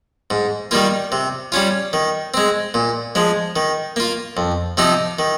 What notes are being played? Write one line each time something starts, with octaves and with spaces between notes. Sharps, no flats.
G#2
D#3 G3 A#3 F4
C3
G3 C#4 F4
D#3
G#3 C4
A#2
F3 G#3
D#3
A#3 F4
F2
C3 F3 C4 D#4
D#3